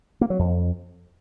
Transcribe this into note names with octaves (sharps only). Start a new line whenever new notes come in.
A#3
F#3
F2